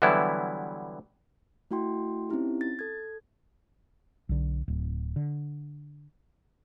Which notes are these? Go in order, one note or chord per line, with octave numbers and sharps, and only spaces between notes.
D3 E3 F#3 G3 B3 E4
A3 E4 F#4 G5 C6
C4 C#4 D#4 E4 G4
A6
A4 G#6
B1 D3
D1
D3